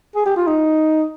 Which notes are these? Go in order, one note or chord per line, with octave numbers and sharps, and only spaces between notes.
G#4
G4
F4
D#4